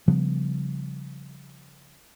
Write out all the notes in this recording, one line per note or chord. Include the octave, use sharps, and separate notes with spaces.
C#3 F3 G3 B3